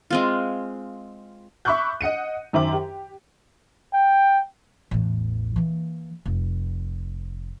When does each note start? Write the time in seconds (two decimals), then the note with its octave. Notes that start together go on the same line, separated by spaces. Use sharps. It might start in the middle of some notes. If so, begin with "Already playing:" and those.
0.10 G#3 C4 F4
1.65 E5 B5 C#6 D6 F#6 G6
2.01 D#5 F#5 C#7 D#7
2.53 F#2 D#3 C5 E5 D6
2.73 G4
3.93 G5
4.91 A1 E2
5.56 E3 A#3
6.26 F1